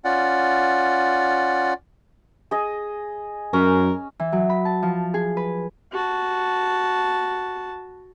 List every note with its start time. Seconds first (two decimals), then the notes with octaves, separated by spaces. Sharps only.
0.04 C#4 F4 D5 F#5
2.51 G#4 D#5
3.53 F#2 C#4 A#4
4.20 E3
4.32 F#3
4.49 B5
4.65 A5
4.83 F3
5.14 G#4
5.37 B4
5.92 F#4 A5